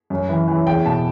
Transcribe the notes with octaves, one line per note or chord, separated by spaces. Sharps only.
F#2
E3
E3
E2 G5
B2 A5